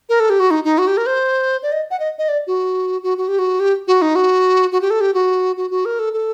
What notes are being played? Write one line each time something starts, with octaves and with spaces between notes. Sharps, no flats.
A#4
A4
G4
F#4
D#4
D#4
F#4
G4
A#4
C5
D5
D#5
F#5
D#5
D#5
D5
F#4
F#4
F#4
G4
F#4
G4
F#4
D#4
F#4
F#4
G4
A4
G4
F#4
F#4
F#4
A#4
A4
A4